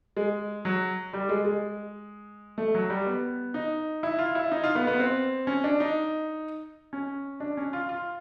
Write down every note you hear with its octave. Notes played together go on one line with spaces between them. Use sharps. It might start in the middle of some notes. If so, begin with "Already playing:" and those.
G#3
F#3
G3
G#3
G#3
A3
F#3
G3
B3
D#4
E4
F4
E4
D#4
F4
B3
B3
C4
C#4
D4
D#4
C#4
D4
C#4
F4
F4